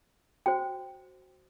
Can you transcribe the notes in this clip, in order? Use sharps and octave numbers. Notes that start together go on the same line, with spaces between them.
F#4 C5 G5